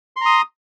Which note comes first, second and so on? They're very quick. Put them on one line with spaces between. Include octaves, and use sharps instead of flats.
C6 A#5 D#6